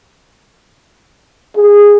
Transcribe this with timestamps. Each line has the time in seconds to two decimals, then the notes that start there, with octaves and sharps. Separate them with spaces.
1.57 G#4